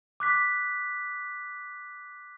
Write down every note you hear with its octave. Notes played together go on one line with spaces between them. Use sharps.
D6 F#6 B6